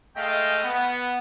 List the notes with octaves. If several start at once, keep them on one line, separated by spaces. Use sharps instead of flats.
G#3 A3 D#5 F5 G5
B3